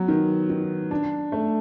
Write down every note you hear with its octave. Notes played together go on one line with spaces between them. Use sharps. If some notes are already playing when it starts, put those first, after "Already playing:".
Already playing: F#3 B3
D#3
D#3
D4
A3